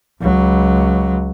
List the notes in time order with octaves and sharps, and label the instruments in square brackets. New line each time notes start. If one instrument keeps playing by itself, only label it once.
[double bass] C#2 F#3